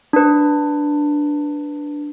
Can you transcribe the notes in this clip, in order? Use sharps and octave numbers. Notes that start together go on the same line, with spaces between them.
D4 B4